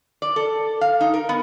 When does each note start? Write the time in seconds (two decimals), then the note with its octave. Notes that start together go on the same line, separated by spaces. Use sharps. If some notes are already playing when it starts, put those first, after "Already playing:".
0.22 D5
0.36 A4
0.81 F5
1.01 D#4
1.14 A#4
1.29 B3